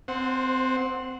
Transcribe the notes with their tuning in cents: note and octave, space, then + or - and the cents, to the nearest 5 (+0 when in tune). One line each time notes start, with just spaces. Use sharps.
C4 -20 C5 +10 F#5 -5